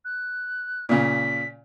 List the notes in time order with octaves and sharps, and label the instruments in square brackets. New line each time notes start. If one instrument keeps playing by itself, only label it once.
[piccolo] F#6
[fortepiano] A#2 C#3 [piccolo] B6